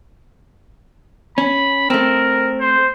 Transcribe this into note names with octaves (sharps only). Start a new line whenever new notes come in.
C#4 B5
A3 C4 A#4
C5